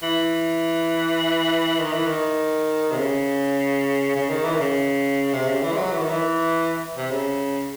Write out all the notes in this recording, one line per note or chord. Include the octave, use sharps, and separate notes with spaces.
E3
D#3
E3
D#3
C3
C#3
C#3
D#3
E3
D#3
C#3
C3
C#3
E3
G#3
F#3
E3
D#3
E3
C3
C#3